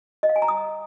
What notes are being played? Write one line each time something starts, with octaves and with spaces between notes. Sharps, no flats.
D#5
F5
G#5
A#5
D#6